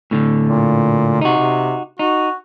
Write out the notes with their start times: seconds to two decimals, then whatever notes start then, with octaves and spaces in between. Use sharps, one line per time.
0.11 A2 D3
0.48 A#2
1.21 C3 D#4 F#4
1.38 C3
1.99 D#4 F#4